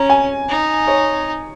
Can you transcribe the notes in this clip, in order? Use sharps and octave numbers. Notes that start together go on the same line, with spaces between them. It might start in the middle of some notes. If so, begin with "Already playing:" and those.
Already playing: C#4 A#5
G#5
D#4
C#5